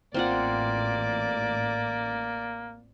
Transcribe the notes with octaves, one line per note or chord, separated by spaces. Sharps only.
A1 A#3 C4 F4 D5 F#5